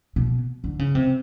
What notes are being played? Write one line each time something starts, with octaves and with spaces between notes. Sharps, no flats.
B2
D3
C#3
C3